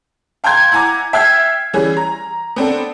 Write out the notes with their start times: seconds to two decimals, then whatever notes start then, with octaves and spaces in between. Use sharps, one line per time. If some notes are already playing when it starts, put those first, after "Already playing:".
0.44 F5 G5 A#5 C6 G6 G#6
0.72 E4 F#5 G#5 A#5 D6
1.13 E5 G5 F6 G#6 C7
1.73 E3 G3 C#4 G#4
1.97 A#5
2.56 B3 C4 D4 A4